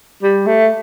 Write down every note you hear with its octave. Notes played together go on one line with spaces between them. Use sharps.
G3
A3